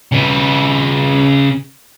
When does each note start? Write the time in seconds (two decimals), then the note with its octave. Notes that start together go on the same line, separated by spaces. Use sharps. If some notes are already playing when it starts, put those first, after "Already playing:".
0.12 C#3 B4